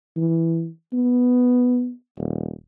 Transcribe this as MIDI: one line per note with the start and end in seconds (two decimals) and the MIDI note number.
0.17 0.68 52
0.93 1.91 59
2.18 2.52 27